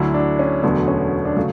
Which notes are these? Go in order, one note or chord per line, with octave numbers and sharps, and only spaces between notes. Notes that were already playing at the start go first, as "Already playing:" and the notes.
Already playing: D2 D3 F#3 E4
D4
C#4
E1 D2 D3 F#3 B3
C#4
D4
C#3 F#3 A3